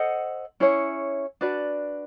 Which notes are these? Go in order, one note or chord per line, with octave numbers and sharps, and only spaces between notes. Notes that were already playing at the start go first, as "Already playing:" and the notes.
Already playing: A4 C5 D#5 F#5
C#4 E4 G#4 C#5
D4 F#4 B4 D5